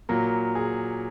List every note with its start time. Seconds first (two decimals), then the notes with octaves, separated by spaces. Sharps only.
0.09 A#2 F#3 A#4
0.55 G#4